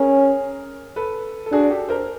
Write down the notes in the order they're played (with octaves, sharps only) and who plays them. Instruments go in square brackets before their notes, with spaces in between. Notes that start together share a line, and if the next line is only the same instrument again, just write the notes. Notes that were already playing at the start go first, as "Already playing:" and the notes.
Already playing: [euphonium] C#4 [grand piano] G#4 A#4
[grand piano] A4 B4
A4
[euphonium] D4 [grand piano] F#4 G#4
[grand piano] G4 A4
A#4 C5